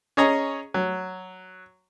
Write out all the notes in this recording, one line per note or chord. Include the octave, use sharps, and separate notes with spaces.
C#4 G#4 C#5 D#5 A#5
F#3